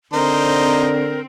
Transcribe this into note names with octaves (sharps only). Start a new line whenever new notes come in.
D3 C4 D#4 A#4 C5